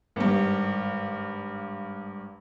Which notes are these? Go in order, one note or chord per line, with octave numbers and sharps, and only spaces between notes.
G#1 G2